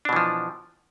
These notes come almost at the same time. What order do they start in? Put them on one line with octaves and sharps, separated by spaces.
D4 B2 E3 F3